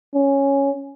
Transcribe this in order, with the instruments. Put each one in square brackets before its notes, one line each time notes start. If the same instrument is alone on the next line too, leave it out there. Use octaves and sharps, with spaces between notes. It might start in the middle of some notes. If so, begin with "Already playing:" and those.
[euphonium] C#4